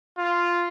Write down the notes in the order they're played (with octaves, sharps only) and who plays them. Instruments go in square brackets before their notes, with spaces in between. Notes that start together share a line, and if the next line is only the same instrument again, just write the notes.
[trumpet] F4